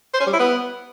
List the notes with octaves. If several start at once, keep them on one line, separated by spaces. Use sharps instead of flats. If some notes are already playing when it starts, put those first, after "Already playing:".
C5
C#4
G3
E4
B3